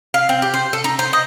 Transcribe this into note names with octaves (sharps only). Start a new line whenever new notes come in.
F5
C4
G4
C5
A4
D#4
C5
D#5